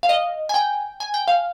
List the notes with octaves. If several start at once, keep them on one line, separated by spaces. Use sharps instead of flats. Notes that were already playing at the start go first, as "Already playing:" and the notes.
F5
D#5
G#5
G5
G#5
G5
F5